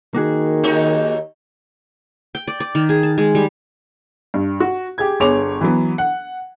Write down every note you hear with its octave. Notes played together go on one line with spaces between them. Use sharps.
D#3 A#3 F#4 G#4
D#2 D#4 C#5
G5
D5
D5
D#3
G#4
A5
G#3
G3
G2
F#4
G4 G#4 G#6
G1 B3 G#4 C#5 D6 F7
E3 F#3 B3
F#5